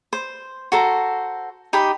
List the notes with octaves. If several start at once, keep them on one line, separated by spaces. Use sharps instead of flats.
C5
F#4 A4 C5 A#5
D#4 G4 G5 B5